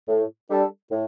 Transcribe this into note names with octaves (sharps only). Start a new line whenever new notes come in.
A2
G3 D4 A4
A2